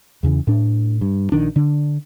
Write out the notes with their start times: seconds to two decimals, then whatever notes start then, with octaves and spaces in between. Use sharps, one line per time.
0.23 E2 C#3 E3
0.47 A2 D4
1.01 G2
1.32 A#1 D#3 D4
1.56 D3 D4